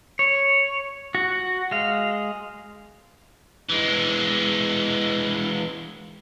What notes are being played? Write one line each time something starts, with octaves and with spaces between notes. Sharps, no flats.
C#5
F#4
G#3 F5
E3 G#3